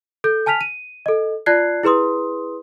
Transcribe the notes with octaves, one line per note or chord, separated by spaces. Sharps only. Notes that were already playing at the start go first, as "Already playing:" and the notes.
A4 G6
G#5 A5 F6 B6 F7
D#7
A4 D#5
F4 D5 A5 F#6 G#6 C7
E4 G#4 B4 C6 D#6